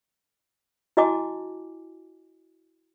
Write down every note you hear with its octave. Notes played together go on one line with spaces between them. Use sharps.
E4 F#4 D#5 G#5 A5 D6